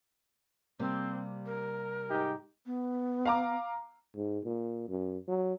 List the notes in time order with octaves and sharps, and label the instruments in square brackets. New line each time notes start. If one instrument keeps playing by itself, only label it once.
[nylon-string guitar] C3 G3 A#3 [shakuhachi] C4
[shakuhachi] A#4
[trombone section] G#2 D#4 G4
[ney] B3
[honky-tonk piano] F5 A#5 D6
[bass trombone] G#2
A#2
F#2
F#3